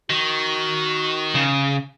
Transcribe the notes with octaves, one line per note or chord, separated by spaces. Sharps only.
D#3 F#4
C#3